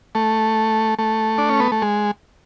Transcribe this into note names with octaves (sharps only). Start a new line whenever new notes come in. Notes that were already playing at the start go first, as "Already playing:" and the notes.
A3
A3
D4
C#4
B3
A3
G#3